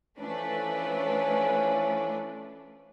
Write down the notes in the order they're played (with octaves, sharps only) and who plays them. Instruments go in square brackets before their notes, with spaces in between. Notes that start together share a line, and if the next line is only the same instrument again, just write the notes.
[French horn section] E3 F3 C#4 [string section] A3 D4 B4